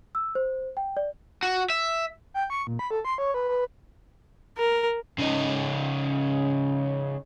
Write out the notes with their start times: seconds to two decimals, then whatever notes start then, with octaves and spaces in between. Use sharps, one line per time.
0.15 E6
0.35 C5
0.77 G5
0.97 D5
1.43 F#4
1.70 E5
2.34 G5
2.50 C#6
2.67 A#2
2.79 B5
2.91 A4
3.05 C6
3.18 C#5
3.34 B4
3.49 B4
4.58 A#4
5.18 C#3 D#4